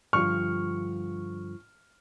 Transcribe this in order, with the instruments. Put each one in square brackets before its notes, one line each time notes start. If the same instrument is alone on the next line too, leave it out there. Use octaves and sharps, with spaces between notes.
[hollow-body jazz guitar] G2 D3 F3 [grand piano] C#6 F6